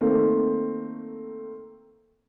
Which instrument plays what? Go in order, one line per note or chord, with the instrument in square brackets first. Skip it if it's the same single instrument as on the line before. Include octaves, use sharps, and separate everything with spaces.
[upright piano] D#3 A3 A#3 C4